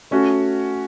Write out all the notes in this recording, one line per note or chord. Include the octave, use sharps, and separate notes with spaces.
A3 C#4 F#4